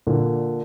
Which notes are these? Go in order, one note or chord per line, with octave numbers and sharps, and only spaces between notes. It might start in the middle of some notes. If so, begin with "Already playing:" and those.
A#2 D3